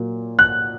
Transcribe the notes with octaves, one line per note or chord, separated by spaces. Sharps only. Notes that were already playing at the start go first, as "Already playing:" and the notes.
Already playing: A#2 F#3 A#3
F#6